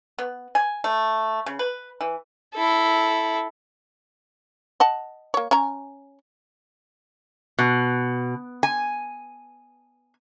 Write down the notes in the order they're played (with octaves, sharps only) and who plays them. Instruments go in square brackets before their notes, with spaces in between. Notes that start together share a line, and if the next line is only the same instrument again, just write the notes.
[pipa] B3
G#5
A3
C#3
B4
E3
[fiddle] E4 A4
[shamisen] D#5 F#5 A5
A#3 C#5
C#4 G#5 A#5
[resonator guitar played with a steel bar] B2
G#5